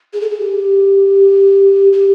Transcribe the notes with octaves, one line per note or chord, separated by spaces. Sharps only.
G#4
A4
G#4
G4
G4